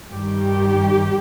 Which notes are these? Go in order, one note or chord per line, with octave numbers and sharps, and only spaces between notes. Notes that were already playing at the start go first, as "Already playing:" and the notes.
G2 D#3 G3 G4